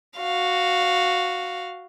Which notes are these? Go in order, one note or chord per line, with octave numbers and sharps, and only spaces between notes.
F#4 F5